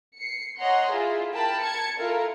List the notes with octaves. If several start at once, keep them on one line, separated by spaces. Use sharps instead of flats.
C7 C#7
C#5 D#5 F#5 A#5 C6
E4 F4 G#4
A#4 G5 A5 B5
A5 G#6 C#7
E4 F4 A4 A#4